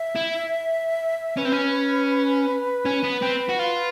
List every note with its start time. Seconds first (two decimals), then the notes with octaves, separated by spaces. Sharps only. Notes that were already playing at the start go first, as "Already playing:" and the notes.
Already playing: E5
0.15 E4
1.37 C#4 B4
1.45 C4
1.53 C#4
2.85 C#4
3.03 B3
3.22 C4
3.49 F#4
3.59 F4